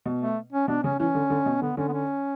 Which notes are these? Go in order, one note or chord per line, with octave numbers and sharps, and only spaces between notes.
B2
A3
C#4
B2 D4
C#3 C#4
E3 C#4
D3
D3
B2
D3 B3
D3 C#4
B3
C#4